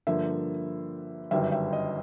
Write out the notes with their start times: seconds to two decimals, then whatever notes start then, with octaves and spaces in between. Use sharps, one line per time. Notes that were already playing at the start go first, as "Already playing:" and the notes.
0.07 G2 D3 F3 A#3 E5
1.31 G1 F#2 D#3 G3 E5
1.52 E5
1.73 D#5